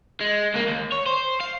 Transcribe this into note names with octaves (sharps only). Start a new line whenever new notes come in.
G#3
C#2 A#3
D#2
C#5
C5
F5